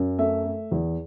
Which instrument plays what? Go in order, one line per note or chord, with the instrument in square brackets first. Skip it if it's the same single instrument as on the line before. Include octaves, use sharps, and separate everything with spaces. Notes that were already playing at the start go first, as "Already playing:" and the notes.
Already playing: [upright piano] F#2
A3 E5
A3
E2